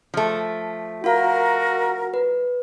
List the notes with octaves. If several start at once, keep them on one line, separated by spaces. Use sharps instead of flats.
F3 A3
F4 F#4 A#4 F5
B4